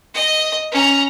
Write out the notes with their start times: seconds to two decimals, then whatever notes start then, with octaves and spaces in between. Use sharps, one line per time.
0.14 D#5
0.72 C#4 A#5